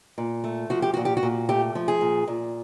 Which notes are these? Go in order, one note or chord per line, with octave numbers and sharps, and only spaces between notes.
A#2
A3
F3 F#4
G4
A#2 F#4
G4
F#4
A#2
A3 G4
F3
G#4
A#2
A#2